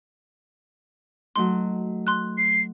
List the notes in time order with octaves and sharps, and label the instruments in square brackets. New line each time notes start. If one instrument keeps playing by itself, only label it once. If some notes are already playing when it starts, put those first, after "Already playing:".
[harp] F#3 A3 D#4 [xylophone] C6
[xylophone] C6 F#6
[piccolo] C7